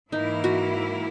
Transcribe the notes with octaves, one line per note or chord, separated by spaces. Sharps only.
G#2 E3 A#3 D#4 E4 A#4
F#4